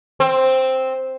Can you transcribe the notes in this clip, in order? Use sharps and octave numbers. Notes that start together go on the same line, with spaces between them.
C4